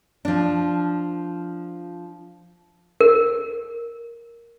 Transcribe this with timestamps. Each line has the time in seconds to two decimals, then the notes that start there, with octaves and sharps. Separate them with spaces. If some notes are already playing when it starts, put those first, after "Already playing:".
0.25 F3 D4
3.01 A#4